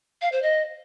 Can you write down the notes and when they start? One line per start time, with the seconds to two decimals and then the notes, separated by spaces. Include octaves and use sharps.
0.22 F5
0.32 C5
0.42 D#5